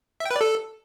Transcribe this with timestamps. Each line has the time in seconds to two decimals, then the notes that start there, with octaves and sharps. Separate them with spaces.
0.20 E5
0.25 G5
0.31 B4
0.36 D5
0.41 A4